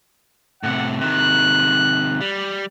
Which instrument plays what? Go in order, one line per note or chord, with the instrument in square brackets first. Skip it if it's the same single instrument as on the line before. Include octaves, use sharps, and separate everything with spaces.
[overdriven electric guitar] A2 C3 [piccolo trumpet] F#5
[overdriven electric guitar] C3 D#3 [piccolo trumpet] F#6
[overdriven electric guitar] G3